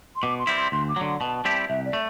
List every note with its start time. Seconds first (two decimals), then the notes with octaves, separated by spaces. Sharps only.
0.16 C6
0.23 B2 D6
0.39 C6
0.47 G3 C4 E4
0.56 C6
0.72 D2 C6
0.89 D6
0.96 F#3
1.01 D3 C6
1.20 B2 A5
1.45 G3 C4 E4 G4
1.69 C2 E5
1.85 D5
1.93 A3